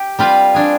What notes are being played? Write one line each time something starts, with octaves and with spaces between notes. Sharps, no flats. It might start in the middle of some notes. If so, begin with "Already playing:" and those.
Already playing: G4
G3 C4 F4 B4 F5
G3 D4 G#4